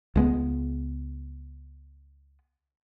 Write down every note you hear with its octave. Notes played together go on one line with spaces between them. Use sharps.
C#2 G#3 B3